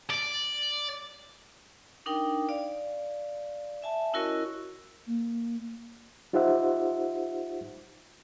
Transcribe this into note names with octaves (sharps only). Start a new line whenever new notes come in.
D5
D4 D#4 A#4 G5
D5 F5
E5 G#5 A5
C#4 E4 F#4 A#4 C#5 D#5
A#3
D#4 F4 G4 C5 E5 F#5